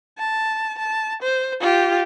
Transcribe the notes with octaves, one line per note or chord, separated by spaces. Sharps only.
A5
A5
C5
F4 G4